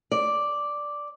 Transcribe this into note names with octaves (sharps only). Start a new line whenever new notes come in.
D5